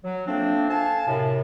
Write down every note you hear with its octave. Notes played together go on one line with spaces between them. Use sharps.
F#3
F3 A3 A#3 C4 D4
A4 F5 G#5 A5
F#2 A2 C3